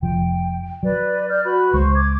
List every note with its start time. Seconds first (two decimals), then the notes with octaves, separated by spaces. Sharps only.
0.02 F1 F3 G5
0.83 F#3 B4 D5
1.29 D5 F6 G6
1.44 F#4 B4 B5
1.73 C#2 G#3 C5 C#6
1.94 D6 G#6